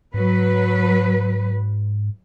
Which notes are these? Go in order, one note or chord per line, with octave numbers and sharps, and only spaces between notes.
G#2 F#3 B4